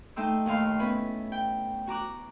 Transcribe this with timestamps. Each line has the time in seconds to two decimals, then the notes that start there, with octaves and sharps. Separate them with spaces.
0.16 A3 D#4 G5 C6 E6
0.46 D#2 A2 F5 C6
0.79 B3 C#4 E4 B4
1.32 G5
1.87 F#4 A#5 D6 F#6